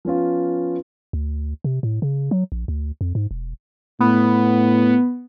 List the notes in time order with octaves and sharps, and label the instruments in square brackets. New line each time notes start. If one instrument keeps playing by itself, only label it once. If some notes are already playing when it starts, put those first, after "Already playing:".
[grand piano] F3 B3 C#4 F4
[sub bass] D2
C3
A2
C#3
F#3
A#1
D2
F2
G#2
E1
[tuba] A2 [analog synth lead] B3